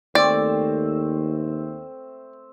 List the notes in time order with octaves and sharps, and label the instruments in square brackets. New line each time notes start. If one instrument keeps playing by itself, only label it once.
[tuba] D#2 [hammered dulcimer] A3 C4 [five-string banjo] D5